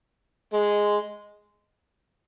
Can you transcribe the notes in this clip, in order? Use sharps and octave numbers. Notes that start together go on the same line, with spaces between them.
G#3